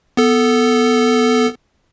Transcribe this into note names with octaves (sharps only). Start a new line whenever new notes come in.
B3 A4